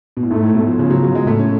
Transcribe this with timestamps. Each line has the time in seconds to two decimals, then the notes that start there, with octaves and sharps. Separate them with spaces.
0.17 B2
0.23 A2
0.30 G#2 A3
0.43 A2
0.54 B2
0.67 F3
0.79 C#3 F3
0.90 F#3
1.03 F#3
1.15 G#3
1.26 A2 A3
1.39 C#4